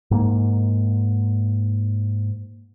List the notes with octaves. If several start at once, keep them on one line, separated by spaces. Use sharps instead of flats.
G#2 A#3